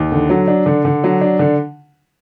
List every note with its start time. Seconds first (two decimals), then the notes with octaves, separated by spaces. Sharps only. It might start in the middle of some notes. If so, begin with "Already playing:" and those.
Already playing: D#2
0.12 D3
0.30 F#3
0.48 D4
0.66 D3
0.85 D3
1.04 F#3
1.21 D4
1.39 D3